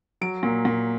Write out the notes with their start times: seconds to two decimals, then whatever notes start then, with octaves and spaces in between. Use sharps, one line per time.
0.21 F#3 D7
0.43 A#2
0.65 A#2